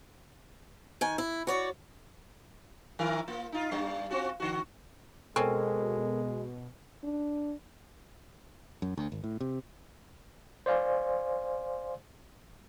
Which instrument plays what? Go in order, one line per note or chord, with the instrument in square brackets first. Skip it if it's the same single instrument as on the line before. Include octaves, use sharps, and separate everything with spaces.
[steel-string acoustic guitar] D#3 G#5
E4
F#4 C#5 D5
[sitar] D#3 E4 A#4
A#3 F4
D#4 F4
G2 G3 D4
C4 F4 F#4
D3 F#4
[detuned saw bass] B2 [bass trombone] G#3 [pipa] C4 C#4 [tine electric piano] A4 A#4
[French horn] D4
[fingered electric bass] F#2
D2
G#1
A2
C3
[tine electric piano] C5 D5 F5 G#5 C6